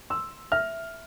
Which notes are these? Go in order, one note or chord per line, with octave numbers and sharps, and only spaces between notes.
C6 E6
E5 F6